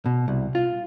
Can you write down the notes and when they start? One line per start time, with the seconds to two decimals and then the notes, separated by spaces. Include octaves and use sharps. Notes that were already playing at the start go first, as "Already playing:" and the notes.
0.06 B2
0.28 C2
0.55 F4